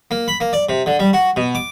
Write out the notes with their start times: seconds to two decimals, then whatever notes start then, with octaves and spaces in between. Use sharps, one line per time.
0.11 A#3
0.28 B5
0.40 A#3
0.53 D5
0.69 C3
0.86 D3
0.99 G3
1.13 F#4
1.36 B2
1.55 D6